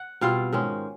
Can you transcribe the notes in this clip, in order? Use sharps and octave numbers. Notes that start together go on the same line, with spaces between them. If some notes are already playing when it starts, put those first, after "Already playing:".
Already playing: F#5
B2 G3 C4 F4 F5
G#2 D#3 G#3 C#4